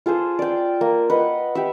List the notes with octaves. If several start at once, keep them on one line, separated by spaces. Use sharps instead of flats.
F4 G#4 A4 C5
D5 G5
A#3
B4 D#5 F#5
G4 E5